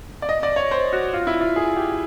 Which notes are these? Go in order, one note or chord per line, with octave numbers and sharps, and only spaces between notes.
D5
D#5
D5
C#5
C5
F#4
F4
E4
F4
G#4
G4